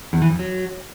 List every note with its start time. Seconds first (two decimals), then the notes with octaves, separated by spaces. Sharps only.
0.13 E2
0.22 E3
0.30 F2
0.39 F#3